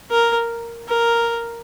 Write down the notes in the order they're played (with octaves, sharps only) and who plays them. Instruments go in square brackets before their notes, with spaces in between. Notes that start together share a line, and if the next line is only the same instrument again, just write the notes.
[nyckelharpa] A#4
A#4